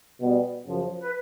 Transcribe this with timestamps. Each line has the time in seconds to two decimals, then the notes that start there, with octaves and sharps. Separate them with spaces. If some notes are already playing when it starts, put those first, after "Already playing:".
0.20 B2 G3 B3
0.65 F#2 C#3 F3
0.98 B4